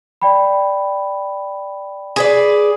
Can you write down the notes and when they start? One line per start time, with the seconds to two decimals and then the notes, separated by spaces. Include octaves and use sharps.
0.22 D5 G5 B5
2.16 G#4 B4 D5